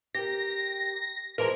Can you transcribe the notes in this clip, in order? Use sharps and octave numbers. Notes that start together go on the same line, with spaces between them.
G4 A#4 A#6
E3 F3 G#3 A#4